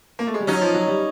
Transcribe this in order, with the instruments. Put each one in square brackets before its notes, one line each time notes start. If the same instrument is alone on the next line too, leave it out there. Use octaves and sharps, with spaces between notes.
[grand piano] A#3
A3
G#3
G3
[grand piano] F#3 [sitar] C#4 D#4
[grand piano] F3
F#3
G3